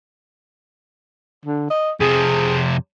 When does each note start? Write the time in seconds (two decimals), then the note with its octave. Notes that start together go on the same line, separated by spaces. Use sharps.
1.45 D3
1.70 D#5
2.00 F2 C3 G#4